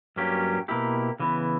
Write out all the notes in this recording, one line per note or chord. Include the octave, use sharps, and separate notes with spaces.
G2 F#3 A#3 C#4 G4
B2 A#3 E4 G4
C#3 E3 B3